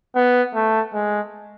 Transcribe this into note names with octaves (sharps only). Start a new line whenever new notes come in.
B3
A3
G#3